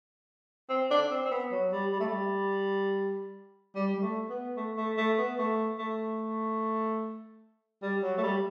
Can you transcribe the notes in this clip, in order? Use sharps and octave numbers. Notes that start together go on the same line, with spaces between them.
C4
D4
C4
C4
B3
F#3
G3
G3
A3
G3
G3
G3
A3
B3
A3
A3
A3
B3
A3
A3
G3
F#3
A3
G3